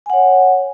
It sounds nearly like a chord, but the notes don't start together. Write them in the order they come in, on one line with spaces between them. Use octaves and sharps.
G#5 F#5 C#5